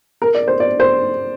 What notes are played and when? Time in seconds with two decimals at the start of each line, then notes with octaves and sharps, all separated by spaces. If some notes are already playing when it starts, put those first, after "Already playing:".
0.22 A#4
0.35 D5
0.48 C5
0.60 D5
0.80 C5